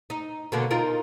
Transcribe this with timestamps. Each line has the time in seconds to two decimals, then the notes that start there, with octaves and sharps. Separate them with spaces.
0.10 D#4
0.52 B2 D3 A#3
0.71 D#4 F4 A#4